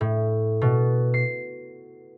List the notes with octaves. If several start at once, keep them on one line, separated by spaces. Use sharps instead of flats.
A2
B2
C7